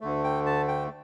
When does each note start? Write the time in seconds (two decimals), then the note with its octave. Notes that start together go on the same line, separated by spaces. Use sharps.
0.01 D2 D3 A3
0.24 G5
0.46 A5
0.68 G5